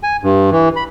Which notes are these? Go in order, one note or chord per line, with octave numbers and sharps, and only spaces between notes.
G#5
G2
E3
B5